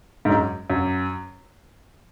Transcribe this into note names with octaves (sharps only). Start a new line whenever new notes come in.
G#2
F#2
F#2